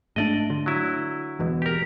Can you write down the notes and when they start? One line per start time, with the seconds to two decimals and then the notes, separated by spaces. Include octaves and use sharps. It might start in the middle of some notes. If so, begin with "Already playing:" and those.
0.16 G#2 A3 D4 D5 D#5
0.50 D3
0.66 F#3 E4
1.39 E1 E2 B2
1.62 G4 A#4